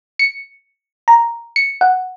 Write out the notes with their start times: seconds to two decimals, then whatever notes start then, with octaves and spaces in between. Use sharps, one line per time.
0.19 C#7
1.08 A#5
1.56 C#7
1.81 F#5